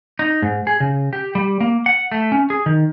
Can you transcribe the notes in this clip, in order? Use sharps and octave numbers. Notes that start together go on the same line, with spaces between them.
D#4
G#2
G#4
C#3
G4
G3
A#3
F#5
A3
C#4
G#4
D#3